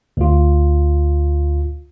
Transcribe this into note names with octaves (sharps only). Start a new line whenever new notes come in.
D2 F4